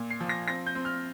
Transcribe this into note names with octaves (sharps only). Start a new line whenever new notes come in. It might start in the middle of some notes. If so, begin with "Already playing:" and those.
Already playing: A#2
C7
F3
A#6
C4 A#6
G6
C4
F6